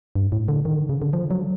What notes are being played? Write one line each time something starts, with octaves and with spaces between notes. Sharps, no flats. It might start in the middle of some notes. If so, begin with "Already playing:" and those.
G2
A2
D3
D#3
D3
C#3
D3
F3
F#3